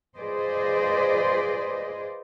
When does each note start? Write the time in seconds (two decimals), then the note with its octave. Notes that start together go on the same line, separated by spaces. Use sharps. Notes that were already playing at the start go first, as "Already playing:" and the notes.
0.18 F4 G#4 B4 C5 D5 D#5